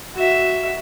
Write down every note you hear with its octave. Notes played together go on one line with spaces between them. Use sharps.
F#4 E5